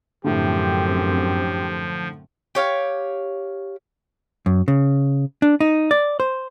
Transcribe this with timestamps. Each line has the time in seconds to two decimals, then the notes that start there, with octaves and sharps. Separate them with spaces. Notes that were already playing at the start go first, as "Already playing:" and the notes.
0.24 F#2 A2 D3 F3 C4 G4
2.55 G4 C#5 F5
4.46 F#2
4.68 C#3
5.42 D4
5.60 D#4
5.91 D5
6.20 C5